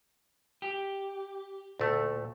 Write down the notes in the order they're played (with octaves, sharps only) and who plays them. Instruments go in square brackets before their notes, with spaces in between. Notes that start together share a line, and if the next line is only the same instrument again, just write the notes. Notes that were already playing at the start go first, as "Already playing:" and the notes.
[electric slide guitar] G4
[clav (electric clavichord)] D2 A3 [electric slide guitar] A#2